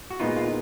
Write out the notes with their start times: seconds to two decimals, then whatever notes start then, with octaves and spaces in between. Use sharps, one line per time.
0.11 F#4
0.20 A#2 G#3 B3 D#4 F4
0.36 F4